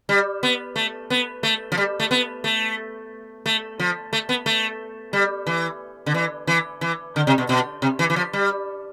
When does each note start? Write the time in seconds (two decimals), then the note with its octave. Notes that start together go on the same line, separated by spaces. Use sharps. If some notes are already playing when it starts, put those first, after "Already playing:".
0.09 G3
0.43 B3
0.76 A3
1.10 B3
1.43 A3
1.72 F3
1.78 G3
2.00 A3
2.11 B3
2.44 A3
3.46 A3
3.80 F3
4.13 A3
4.29 B3
4.46 A3
5.13 G3
5.47 E3
6.06 D3
6.14 E3
6.47 E3
6.81 E3
7.16 D3
7.27 C3
7.38 B2
7.49 B2
7.82 C3
7.99 E3
8.10 E3
8.16 F3
8.33 G3